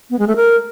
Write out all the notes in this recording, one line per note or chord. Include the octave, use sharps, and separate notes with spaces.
B3
G#3
A3
A#4